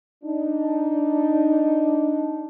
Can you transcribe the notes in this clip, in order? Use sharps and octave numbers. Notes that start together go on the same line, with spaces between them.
D4 D#4